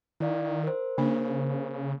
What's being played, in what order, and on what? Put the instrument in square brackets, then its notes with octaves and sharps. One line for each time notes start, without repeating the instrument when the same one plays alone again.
[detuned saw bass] D#3 [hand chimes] E4 D5 F5
[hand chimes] A#4 C5
[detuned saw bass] C#3 [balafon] A#3 D4